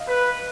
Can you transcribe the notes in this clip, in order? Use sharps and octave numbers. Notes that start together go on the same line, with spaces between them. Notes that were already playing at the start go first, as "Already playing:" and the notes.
Already playing: D#5 F5
B4